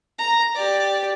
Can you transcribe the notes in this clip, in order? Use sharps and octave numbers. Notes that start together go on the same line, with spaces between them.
A#5
G4 D5